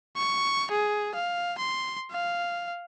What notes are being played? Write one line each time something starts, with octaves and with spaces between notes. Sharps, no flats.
C#6
G#4
F5
C6
F5